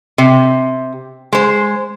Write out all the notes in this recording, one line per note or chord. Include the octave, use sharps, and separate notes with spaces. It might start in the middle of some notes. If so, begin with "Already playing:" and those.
C3
G#3 C5